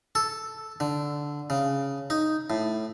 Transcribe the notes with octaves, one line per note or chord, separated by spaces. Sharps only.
A4
D3
C#3
D#4
A2